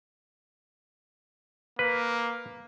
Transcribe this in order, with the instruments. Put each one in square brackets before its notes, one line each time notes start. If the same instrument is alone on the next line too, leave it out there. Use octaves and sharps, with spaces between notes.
[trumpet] A#3 [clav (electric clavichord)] B4